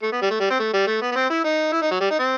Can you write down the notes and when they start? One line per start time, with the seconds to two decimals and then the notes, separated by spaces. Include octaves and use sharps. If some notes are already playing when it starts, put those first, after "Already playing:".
0.02 A3
0.12 B3
0.22 G3
0.30 A3
0.40 G3
0.50 C4
0.59 A3
0.73 G3
0.87 A3
1.01 B3
1.12 B3
1.15 C4
1.30 E4
1.44 D#4
1.72 E4
1.82 D#4
1.91 F#3
2.00 G3
2.10 D#4
2.19 C4